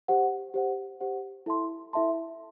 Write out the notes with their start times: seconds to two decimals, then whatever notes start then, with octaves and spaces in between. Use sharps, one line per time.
0.08 G4 C5 F#5
0.54 G4 C5 F#5
1.00 G4 C5 F#5
1.46 E4 A4 E5 A5 C6
1.93 E4 A4 E5 A5 C6